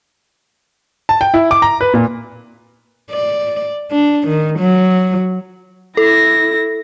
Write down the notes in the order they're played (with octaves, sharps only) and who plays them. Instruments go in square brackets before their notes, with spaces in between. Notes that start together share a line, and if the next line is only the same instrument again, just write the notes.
[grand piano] A5
G5
E4
D6
A#5
B4
A#2
[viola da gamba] D5
D4
D#3
F#3
[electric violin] E4 A#6 [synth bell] A4